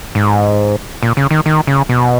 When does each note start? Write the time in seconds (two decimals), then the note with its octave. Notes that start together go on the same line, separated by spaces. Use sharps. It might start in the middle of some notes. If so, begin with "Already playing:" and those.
0.15 G#2
1.03 A#2
1.17 C#3
1.31 D#3
1.46 D#3
1.67 C#3
1.89 B2